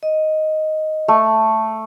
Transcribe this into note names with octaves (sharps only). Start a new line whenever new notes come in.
D#5
A3